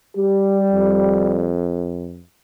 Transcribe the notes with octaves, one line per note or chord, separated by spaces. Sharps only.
G3 G4
F2